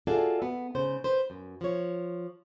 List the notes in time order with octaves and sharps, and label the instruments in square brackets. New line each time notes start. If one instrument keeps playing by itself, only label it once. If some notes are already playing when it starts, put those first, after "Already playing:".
[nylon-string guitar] F4 F#4 G#4 A4 D5 E5
B3
G#2 C#3 C5
B4 C5
F#2
F3 C#5